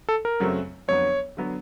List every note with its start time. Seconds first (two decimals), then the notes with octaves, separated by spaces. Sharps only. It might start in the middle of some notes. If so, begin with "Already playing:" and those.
0.09 A4
0.25 A#4
0.40 F#2 C#3 F#3 A3 C4
0.88 F2 D3 F#3 B3 C#5
1.37 D3 F#3 B3